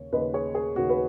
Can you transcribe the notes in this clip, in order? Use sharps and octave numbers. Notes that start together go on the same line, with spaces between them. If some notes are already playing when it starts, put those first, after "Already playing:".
Already playing: D#2 C#3 C#5
D#2 C#3 B4 D#5
G#4 C#5
G#4
D#2 C#3 F#4
B4